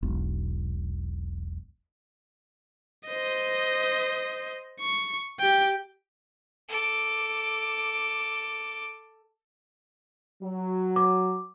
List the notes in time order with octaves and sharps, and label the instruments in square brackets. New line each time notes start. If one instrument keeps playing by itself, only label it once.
[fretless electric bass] E1 B1
[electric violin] C5 D#5
C#6
G4 G5
[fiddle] A4 D6
[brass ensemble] F#3
[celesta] D6